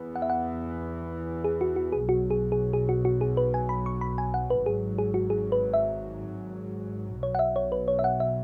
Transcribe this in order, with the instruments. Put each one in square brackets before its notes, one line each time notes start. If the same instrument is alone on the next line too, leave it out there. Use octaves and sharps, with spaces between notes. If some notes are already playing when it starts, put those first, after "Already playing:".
Already playing: [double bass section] E2 E3 B3
[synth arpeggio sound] F#5
E5
F#5
G#4
F#4
F#4
G#4
[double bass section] B1 B2 F#3 [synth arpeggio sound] F#4
[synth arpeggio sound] G#4
G#4
G#4
F#4
F#4
G#4
B4
G#5
B5
C#6
B5
G#5
F#5
B4
[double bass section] G#1 G#2 F#3 [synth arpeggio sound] G#4
[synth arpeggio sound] G#4
F#4
G#4
B4
E5
[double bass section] B1 B2 F#3 [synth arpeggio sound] C#5
[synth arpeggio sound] F#5
E5
C#5
B4
C#5
E5
F#5
E5